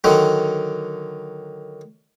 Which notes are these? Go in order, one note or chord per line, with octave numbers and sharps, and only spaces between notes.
D3 D#3 F#3